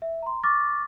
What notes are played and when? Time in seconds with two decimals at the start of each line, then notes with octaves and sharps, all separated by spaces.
0.02 E5
0.22 A#5 C6
0.43 C#6 D6 F6 A6 A#6